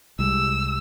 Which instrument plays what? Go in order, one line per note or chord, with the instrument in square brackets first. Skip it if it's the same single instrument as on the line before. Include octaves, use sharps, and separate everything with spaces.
[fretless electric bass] C2 G3 G#3 [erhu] E6